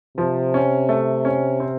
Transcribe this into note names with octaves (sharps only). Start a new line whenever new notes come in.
C3 F3
C#4
A3
C#4
C4